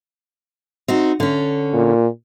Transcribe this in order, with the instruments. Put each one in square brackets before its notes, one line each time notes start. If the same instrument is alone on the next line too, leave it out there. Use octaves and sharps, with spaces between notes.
[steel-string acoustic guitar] C4 D#4 F#4
D3 C#4
[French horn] A#2